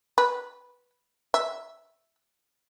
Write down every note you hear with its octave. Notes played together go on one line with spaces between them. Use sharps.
B4
E5